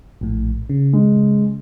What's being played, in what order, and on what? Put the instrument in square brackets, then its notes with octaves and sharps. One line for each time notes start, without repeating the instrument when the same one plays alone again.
[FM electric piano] A#1 A2
C#3
[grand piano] G#3